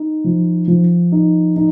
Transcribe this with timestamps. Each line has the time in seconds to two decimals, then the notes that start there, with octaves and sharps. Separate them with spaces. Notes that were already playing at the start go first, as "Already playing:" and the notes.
Already playing: D#4
0.24 F3
0.68 F3
1.12 D#4
1.56 D#4